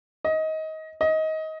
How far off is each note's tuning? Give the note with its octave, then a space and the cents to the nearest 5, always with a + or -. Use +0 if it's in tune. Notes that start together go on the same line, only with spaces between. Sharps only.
D#5 +20
D#5 +20